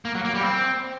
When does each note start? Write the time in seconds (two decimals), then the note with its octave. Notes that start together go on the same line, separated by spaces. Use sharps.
0.05 A#3
0.15 F#3
0.25 A#3
0.34 G3
0.44 C4